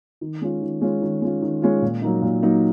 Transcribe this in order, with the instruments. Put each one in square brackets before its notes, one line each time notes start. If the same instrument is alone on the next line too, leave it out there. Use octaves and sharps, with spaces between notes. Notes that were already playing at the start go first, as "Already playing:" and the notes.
[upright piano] D#3
G#3 C#4 F4
D#3
G#3 C#4 F4
D#3
G#3 C#4 F4
D#3
G#3 C#4 F4
A#2
F#3 A#3 D#4
A#2
F#3 A#3 D#4